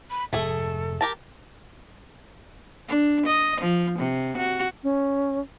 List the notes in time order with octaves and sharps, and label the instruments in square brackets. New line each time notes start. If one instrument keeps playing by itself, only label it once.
[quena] B5
[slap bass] F1 G#2 [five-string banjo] A3 G#4 [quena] A4
[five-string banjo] G4 A#4 A5
[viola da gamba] D4
D#5
F3
C3
F#4
[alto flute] C#4